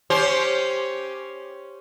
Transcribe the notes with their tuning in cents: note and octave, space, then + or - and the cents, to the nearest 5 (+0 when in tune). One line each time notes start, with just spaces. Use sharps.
C#4 +5 G4 +0 C5 +0